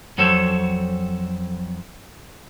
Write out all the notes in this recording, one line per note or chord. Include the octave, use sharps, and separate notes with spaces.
F2 F#3 A4 C5 C#5